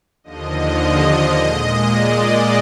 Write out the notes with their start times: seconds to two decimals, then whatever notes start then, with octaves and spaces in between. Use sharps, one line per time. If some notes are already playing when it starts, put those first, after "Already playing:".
0.24 D#2 D3 F3 D#5
1.34 A#2 G#3
1.89 D5